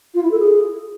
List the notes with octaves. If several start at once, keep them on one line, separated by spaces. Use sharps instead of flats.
F4
E4
A4
G#4